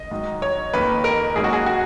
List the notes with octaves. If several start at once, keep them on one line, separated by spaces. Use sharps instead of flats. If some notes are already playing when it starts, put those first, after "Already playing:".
Already playing: D#5
G#2 D#3 F#3
C#5
F2 D#3 A#3 B4
A#4
G#2 F#3 A#3 C#4 G#4
F#4
G#4
F#4